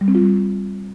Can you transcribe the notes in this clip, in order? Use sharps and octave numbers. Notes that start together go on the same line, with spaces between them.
G3
C4
F4
G3